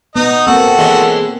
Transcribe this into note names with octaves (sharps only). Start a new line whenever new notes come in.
B3 D#4 D#5
A#3 C4 F#4 A4
E3 G#3 C#4